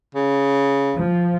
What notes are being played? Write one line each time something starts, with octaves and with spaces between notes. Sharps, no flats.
C#3
F3